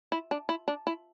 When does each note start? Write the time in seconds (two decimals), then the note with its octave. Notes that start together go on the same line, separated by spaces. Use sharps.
0.12 E4
0.31 D4
0.49 E4
0.68 D4
0.87 E4